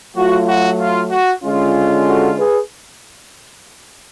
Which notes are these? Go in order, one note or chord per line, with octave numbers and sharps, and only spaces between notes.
F#3 A3 F4 F#4
F#4
F4
F#4
D3 G#3 C#4 F4
F#4 A4
G#4 B4